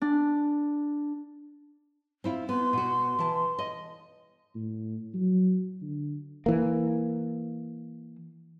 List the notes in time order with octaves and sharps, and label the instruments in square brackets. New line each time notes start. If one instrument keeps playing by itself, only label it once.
[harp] D4
[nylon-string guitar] C4 E4 F4
[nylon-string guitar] B3 [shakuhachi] C6
[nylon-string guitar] B2 F#4
E3 A5
D#5
[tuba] A2
F#3
D3
[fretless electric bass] E3 A#3